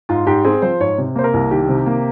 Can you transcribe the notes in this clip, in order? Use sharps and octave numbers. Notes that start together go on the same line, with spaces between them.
G#2 F4
G#2 G4
C4 G#4
F3 C5
G#2 C#5
C3
A#3 C5
A#4
C2
D#3 G4
C3
A#3